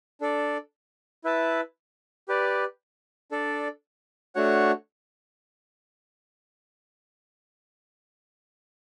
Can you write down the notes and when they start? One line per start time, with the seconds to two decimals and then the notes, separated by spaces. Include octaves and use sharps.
0.21 D4 A4 D5
1.24 E4 B4 E5 A5
2.28 G4 B4 D5
3.31 D4 A4 D5
4.35 A3 D4 F#4 C#5 F#5